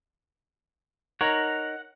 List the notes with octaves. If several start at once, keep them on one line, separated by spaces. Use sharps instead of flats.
D#4 A#4 C#5 F#5